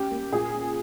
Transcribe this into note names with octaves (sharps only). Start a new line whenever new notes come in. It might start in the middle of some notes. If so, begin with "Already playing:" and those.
Already playing: C#4 G4
A#3
A#2 G#4
C#4